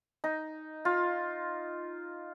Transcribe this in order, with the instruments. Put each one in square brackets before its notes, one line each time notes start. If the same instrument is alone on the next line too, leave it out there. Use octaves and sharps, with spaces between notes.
[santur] D#4
F4